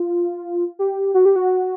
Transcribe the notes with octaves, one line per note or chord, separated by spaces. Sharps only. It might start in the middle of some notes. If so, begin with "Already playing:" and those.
Already playing: F4
G4
F#4
G4
F#4